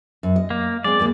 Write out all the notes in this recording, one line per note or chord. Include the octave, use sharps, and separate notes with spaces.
F#2
D#5
A#3
G#3 C4 D5
D#2 G#3 A#3